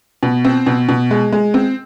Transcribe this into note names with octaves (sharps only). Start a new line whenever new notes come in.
B2
C4
B2
B2
G#3
G#3
C4